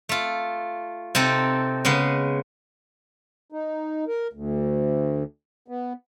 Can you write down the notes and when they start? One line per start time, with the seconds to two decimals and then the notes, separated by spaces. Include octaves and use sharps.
0.09 A3 F4
1.15 C3 C4 D#4 A4
1.85 C#3 G#3 B3
3.52 D#4
4.08 A#4
4.33 D2
5.68 B3